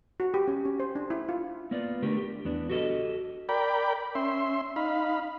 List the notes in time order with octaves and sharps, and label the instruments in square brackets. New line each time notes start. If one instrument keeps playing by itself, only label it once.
[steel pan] F#4
G4
C#4
C#4
C5
D4
E4
F4
[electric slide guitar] A#3 B3 F4 D5
D3 A3 G4 A#4
G4
E2 B3 D4
F#4 G4 A4 C5 D#5
[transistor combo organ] A#4 D5 G5 B5
C#4 E5 C6
D#4 F5 B5